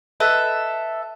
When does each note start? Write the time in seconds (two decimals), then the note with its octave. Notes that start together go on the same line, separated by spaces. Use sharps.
0.20 A4 B4 D#5 E5